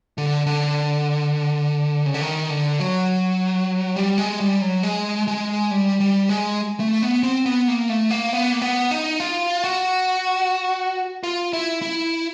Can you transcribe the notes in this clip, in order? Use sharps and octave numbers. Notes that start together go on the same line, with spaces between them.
D3
D3
C#3
D3
D#3
D3
F#3
G3
G#3
G3
F#3
G#3
G#3
G3
G3
G#3
A3
B3
C4
B3
A#3
A3
A#3
B3
A#3
B3
D#4
F4
F#4
F4
E4
E4